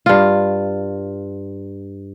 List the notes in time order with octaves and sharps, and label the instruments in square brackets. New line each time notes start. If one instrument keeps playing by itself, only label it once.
[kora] G2 F4